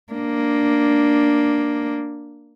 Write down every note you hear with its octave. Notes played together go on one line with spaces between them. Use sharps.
A#3 D4